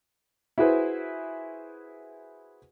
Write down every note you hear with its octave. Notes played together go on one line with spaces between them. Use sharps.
E4 F#4 G#4 B4 C5